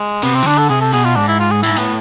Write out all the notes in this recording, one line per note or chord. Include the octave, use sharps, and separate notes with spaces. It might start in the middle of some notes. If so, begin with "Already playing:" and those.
Already playing: G#3
C3 B3
C4
E3
D3 D4
A4
C3 G#4
A4
B2 G#4
F4
G#2 D4
E4
F4
G#4
A2 E4
G#2
A2 B3